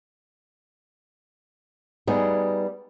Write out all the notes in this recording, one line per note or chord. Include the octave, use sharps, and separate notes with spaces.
G3 B3 D#4 G#4